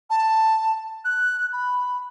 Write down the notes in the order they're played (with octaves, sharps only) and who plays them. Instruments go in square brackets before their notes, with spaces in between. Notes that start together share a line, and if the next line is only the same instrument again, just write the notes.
[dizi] A5
F#6
B5